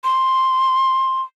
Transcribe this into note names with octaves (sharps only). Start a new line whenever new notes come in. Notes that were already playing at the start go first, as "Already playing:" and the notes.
C6